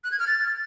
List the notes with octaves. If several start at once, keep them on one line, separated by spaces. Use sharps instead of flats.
F#6
G#6
F6
A6